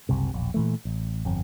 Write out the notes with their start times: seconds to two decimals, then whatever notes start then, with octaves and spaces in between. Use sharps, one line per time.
0.09 F#1 C2 C3
0.34 E1 A#1
0.54 A#2 E3 A3
0.85 A1
1.25 G1 F2